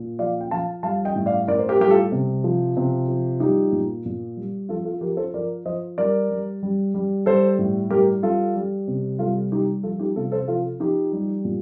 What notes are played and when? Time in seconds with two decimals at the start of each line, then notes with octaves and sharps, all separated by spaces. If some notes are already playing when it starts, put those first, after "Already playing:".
Already playing: A#2
0.19 F3 D5 F5
0.41 G5
0.51 F3 F5 A5
0.83 G3 F5 A5
1.05 D#5 G5
1.16 A2
1.26 D5 F5
1.48 A2 A#4 D5
1.59 C5
1.69 G4 A#4
1.80 G3 G4
1.91 F4 A4
2.12 C3
2.44 F3
2.77 C3
3.08 F3
3.40 G3 D#4 G4
3.72 A#2
4.06 A#2
4.37 G3
4.69 F3 F4 A4
4.85 F4 A4
5.01 F3 G4 A#4
5.17 A4 C5
5.34 F3 A#4 D5
5.65 F3 C5 D#5
5.98 G3 A#4 D5
6.30 G3
6.63 G3
6.94 G3
7.26 G3 A4 C5
7.59 A2
7.90 G3 G4 A#4
8.23 G3 F4 A4
8.56 G3
8.88 C3
9.19 G3 F4 A4
9.52 G3 D#4 G4
9.83 F3 F4 A4
9.99 D#4 G4
10.16 C3 F4 A4
10.32 A4 C5
10.48 F3 F4 A4
10.80 F3 D#4 G4
11.12 G3
11.45 A#2